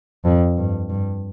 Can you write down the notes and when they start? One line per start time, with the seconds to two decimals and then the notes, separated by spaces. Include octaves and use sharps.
0.25 F2
0.58 G2
0.89 G2